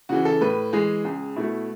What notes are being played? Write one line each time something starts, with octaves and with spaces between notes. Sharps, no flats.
C#3 E3 F#4
A4
A2 B4
E3 G#3 G#4
C#2 G#4
B2 A3 E4